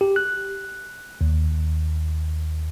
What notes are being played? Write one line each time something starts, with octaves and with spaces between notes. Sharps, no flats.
G4
F#6
D#2